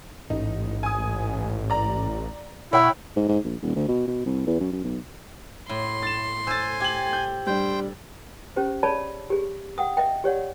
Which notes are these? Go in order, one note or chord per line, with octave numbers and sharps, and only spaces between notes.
A1 G#2 D#4
G#5 D#6
D5 A#5
B2 E4 C#5 F#5 G5
G#2
G#2
A#1
D#1
D2
B2
B2
C2
E2
F#2
F#2
B1
A2 C6
A6 E7
C5 G#5 E6 A6
G4 G#6 F#7
G6
G3 D4 C5 G5
C#4 G4 C5
G#4 C#5 D5 A5 B5
G4 G#4
F#5 G5 D#6
D#5 E5 G5
G4 C#5 D5 F#5